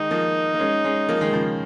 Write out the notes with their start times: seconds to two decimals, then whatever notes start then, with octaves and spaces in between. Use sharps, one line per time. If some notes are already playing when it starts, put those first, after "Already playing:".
Already playing: D#3 G#3 D#4
0.11 F3 A#3
0.54 A#3
0.59 G#3 C#4
0.84 G#3 C#4
1.09 F3 A#3
1.21 D#3 G#3
1.33 C#3 F3